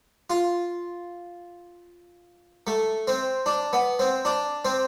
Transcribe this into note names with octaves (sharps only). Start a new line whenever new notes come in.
F4
A3
C4
D4
B3
C4
D4
C4